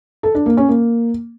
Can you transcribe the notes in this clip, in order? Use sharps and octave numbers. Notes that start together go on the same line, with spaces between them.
A4
D4
A#3
C#4
A#3